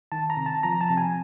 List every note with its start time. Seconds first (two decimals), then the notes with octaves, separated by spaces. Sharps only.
0.12 D#3 A5
0.30 A#5
0.37 C3
0.46 A5
0.63 F3 A#5
0.81 A5
0.89 C3
0.97 G#5